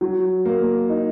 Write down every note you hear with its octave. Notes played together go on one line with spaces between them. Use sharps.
F#3
A#3
D#4